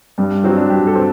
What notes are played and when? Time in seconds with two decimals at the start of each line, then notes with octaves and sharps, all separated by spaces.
0.18 G2 G3
0.44 F#3 C4
0.57 D4
0.70 G2 G4
0.87 A4
0.95 C4